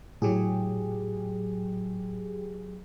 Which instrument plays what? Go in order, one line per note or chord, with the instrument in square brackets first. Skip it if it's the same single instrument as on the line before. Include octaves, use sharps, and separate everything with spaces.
[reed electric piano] A2 [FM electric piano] F#3 G4 G#4